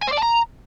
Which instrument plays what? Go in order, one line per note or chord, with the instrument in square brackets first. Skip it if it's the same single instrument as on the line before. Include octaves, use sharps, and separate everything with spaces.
[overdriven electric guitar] G#5
C5
D5
A5
A#5